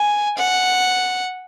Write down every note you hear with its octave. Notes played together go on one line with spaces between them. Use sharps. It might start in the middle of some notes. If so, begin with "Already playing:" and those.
Already playing: G#5
F#5